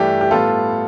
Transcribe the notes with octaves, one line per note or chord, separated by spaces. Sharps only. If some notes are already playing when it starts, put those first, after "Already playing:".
Already playing: G2 E3 A3 D4 G4
G4
A2 G3 B3 F4 A4